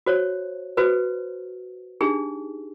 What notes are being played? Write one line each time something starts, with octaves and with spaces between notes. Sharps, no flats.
F#4 C5 C#5
F#4 B4 C5
D4 D#4 G4 G#4